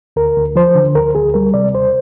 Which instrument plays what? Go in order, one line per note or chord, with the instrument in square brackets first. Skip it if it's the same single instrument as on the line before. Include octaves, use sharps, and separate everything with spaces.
[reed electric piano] D2 A#4
D2
F3 C5
D3
D2 A#4
D2 G#4
G3 A#4
C3 D5
D#2 C5